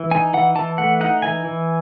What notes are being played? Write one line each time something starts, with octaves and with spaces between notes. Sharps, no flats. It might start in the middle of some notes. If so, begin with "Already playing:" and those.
Already playing: E3
D#4 G#5
E3 F#5
E3 A5
A3 F#5
D#4 F#5
E3 G#5
E3